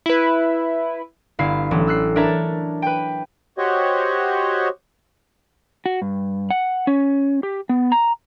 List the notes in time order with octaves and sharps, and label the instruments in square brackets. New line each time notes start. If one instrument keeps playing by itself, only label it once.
[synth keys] E4 B4
[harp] G1 E4 F5 C7
A1 F#3
E6 F#6 C7
D4 A#4 C#5 E5 A5 A#5
B4 G5
[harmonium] F#4 G4 C5 C#5 D#5 F#5
[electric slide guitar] F#4
G2
F#5
C#4
G4
B3
A#5